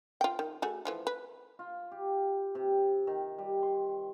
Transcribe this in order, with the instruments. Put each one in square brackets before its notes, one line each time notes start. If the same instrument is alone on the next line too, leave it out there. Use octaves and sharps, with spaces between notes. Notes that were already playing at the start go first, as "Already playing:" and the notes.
[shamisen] F4 G5
D#3
A3 F#4 G#4
E3 F3 A3
B4
[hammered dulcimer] F4
G4
C3
D#3
G3
C6